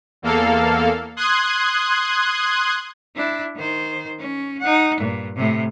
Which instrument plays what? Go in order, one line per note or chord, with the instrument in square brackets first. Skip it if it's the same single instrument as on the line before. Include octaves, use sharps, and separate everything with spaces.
[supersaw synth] E2 A#3 A4 F5
C6 D#6 F#6 G#6
[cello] D4 E4
D#3 C5
C#4
D#4 F#5
G2 A#2
A2 C3